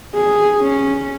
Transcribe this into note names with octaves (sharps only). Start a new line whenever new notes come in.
G#4
C#4